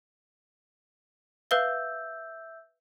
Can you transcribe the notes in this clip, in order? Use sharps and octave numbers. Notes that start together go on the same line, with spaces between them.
B4 E5 F5 E6 G6 G7